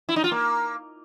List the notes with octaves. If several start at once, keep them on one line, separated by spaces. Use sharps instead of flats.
E4
D#4
F4
A#3